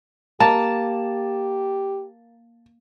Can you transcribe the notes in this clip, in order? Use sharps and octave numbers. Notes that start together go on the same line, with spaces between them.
A#3 G4 A5